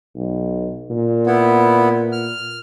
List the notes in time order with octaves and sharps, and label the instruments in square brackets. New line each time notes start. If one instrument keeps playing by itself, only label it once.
[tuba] B1
A#2
[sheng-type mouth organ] B3 E4
F6